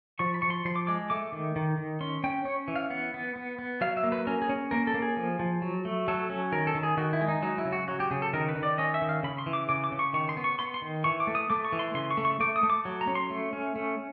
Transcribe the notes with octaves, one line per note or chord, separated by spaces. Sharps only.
F3 C#6
B5
F3 C#6
C6
F3 C6
D6
G#3 D6
A3 D6
D#3
D#3
D#3
C#4 C6
C#4 G5
C#4 C#5
E3
F5
B3 F#5
B3
B3
B3
F#3 F5
E5
A#3
B4
C#4 A#4
G#4
C#4
A#3 A#4
A4
A#3
G#4
F3
F3
F#3
A3
F#3 A4
C#4
D#3 A#4
A4
D#3
G#4
D#3 F#4
E4
G#3
D#4
F#3 D#4
E4
C#3
F#4
F#3 F#4
G4
C#3 G#4
A4
D#3 A#4
B4
D#3
D5
C#4 D#5
E5
D#3
F5
C#3 B5
C6
E3
D6
C#3 D6
D6
C#3
C#6
D#3 C#6
C6
B3
C#6
B3 C6
C6
D#3
E3 C#6
D6
A3
D#6
A3 D6
C#6
E3
C6
C#3 C6
C#6
A3
C#6
A3 D6
D#6
A3
D6
F#3
A#5
C#4
C6
A3
C#4
A3